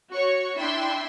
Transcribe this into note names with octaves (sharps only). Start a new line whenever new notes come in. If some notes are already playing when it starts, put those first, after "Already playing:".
F#4 C#5 C#6
D4 E4 E5 G5 C6